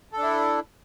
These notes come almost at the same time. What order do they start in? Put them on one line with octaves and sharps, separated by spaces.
A4 D4 E4